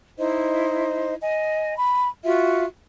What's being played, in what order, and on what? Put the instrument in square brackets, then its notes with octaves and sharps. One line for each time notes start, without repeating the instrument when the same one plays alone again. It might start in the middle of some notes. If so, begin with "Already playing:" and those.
[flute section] D#4 E4 C5 D#5
D#5 G#5
B5
F4 F#4 E5